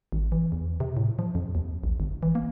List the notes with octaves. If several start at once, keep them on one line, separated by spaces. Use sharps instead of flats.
G#1
E3
E2
C3
A2
F3
F2
D#2
A#1
G1
E3
A#3